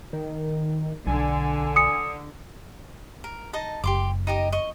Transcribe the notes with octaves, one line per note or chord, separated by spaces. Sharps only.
D#3
B1 D3 G#5
D#6 C#7
A#4
D#4 D#5 A5
F#1 G4 C6 D6
D#4 G4 D#5
D#5 C#6